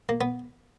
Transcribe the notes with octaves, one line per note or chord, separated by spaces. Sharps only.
A#3
B3